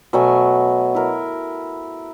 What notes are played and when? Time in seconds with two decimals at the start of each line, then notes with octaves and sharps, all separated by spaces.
0.13 B2 F#3 A3 G#5
0.95 E4 A#4